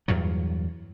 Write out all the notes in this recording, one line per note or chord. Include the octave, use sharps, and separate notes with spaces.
E2 G2 A#2 F#3